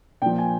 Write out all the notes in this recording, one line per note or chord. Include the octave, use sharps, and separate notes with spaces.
A#2 F3 G5
G#5